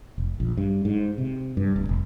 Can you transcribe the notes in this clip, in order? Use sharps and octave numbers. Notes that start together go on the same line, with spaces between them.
F1
A#1
G2
G#2
C3
G2
D1
F1